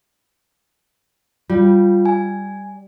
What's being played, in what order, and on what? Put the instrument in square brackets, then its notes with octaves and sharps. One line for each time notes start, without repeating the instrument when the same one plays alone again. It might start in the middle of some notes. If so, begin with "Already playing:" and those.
[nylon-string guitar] G3 [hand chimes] F4
[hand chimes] G#5